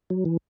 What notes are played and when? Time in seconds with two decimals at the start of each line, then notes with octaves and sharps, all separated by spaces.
0.10 F#3
0.25 E3